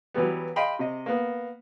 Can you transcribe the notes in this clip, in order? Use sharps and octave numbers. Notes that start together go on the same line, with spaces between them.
E3 F#3 G3 B3
D#5 F5 G5 B5 C6
C3 D#5
A#3 B3